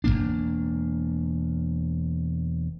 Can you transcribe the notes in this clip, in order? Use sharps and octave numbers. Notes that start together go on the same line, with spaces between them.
E1 G2 A#3 D4